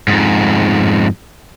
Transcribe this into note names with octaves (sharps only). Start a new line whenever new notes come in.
F2 G#2